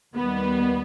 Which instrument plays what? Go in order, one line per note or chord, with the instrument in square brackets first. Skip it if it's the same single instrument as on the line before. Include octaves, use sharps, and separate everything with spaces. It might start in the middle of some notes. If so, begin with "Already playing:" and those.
[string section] D#2 D#3 G3 B3